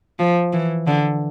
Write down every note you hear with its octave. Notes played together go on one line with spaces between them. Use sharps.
F3
E3
D3